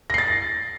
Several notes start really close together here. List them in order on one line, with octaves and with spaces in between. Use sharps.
A#6 C7 A6